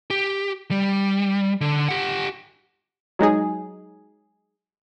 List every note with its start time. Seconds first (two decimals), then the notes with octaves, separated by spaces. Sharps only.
0.10 G4
0.71 G3
1.61 D3
1.89 G4 F#5
3.19 F#3 G#3 D#4 G#4